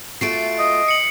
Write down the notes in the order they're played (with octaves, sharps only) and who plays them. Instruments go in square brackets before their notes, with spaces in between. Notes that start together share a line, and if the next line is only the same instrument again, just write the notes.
[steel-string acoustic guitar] A3 F4 F#4 [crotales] C7 D7
[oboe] D#5
[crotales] C#7 F#7